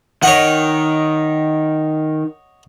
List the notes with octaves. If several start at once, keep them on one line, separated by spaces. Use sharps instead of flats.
D#3 C#5 D#5 F#5